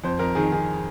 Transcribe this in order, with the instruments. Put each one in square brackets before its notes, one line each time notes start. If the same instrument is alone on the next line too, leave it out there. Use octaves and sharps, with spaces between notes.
[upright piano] F2 C5
F2 A#4
D#3 G#4
D#3 G#4